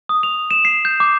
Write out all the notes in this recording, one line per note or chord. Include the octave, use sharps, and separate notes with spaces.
D#6
F7
E7
C7
G6
D6